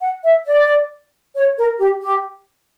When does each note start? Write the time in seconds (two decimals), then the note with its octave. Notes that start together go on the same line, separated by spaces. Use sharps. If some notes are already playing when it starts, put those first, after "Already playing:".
0.01 F#5
0.24 E5
0.46 D5
1.36 C#5
1.58 A#4
1.79 G4
2.03 G4